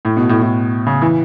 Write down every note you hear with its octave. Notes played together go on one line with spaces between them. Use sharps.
A2
B2
A2
A2
C#3
E3